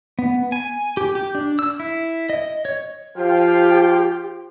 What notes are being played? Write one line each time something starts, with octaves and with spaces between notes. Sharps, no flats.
B3
G#5
G4
G4
D4
E6
E4
D#5
C#5
F3 F4 G4 F5 G5